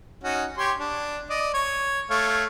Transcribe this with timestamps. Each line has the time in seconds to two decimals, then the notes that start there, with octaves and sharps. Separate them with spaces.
0.24 C#4 D#4 F#4
0.57 G4 C#5 C6
0.79 D4
1.30 D5 D#5
1.54 C#5
2.10 A3 C#5 F5